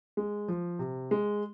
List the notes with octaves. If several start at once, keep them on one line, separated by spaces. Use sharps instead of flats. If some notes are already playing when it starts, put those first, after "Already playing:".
G#3
F3
C3
G#3